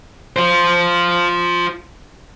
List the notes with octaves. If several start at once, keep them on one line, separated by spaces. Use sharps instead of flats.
F4 C5